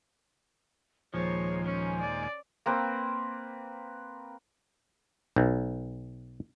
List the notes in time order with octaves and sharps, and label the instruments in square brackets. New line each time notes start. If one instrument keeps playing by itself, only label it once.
[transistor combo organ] D#2 A#2 G#3 [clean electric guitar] F3 [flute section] G#4 C5 [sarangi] C#5
[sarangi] C#4 [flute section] C5 G#5
[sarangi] D5
[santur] A#3 C4 B4
[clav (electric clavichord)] B1